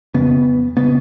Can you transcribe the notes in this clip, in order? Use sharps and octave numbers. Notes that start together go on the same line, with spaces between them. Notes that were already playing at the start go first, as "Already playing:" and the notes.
F2 C#3 B3
C#3 B3